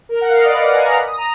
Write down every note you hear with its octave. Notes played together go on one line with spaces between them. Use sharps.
A#4
F#5
F5
D#5
D5
B4
F#5
G#5
A#5
B5
D#6
A#5